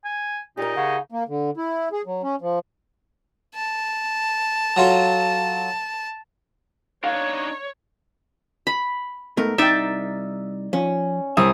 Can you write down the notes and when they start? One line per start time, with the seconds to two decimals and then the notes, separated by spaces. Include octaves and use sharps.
0.05 G#5
0.57 A#2 D#4 G4 A#4
0.76 C#3 F#5
1.11 A#3
1.28 D3
1.57 E4
1.93 G#4
2.06 F#3
2.23 C#4
2.41 F3
3.55 A5
4.76 F#3 F4 A4
7.04 D4 D#4 C#5 F5
8.67 B5
9.37 G#2 A3 B3 A#4
9.58 C2 D#4 D5 E5 G5 A6
10.73 F3 C#4
11.37 C2 E5 D#6